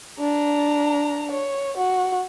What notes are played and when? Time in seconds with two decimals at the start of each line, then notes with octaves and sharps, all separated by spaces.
0.20 D4 A#5
1.31 C#5
1.77 F#4